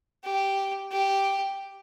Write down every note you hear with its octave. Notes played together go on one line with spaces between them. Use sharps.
G4
G4